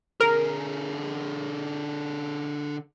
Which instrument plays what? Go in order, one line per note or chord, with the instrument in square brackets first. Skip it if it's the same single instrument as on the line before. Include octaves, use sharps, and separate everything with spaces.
[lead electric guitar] D3 G#4 [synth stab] A#4